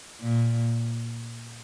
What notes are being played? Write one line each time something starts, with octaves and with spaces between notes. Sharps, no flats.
A#2